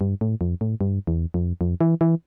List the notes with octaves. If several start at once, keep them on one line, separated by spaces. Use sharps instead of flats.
G2
A2
F2
A2
G2
E2
F2
F2
E3
E3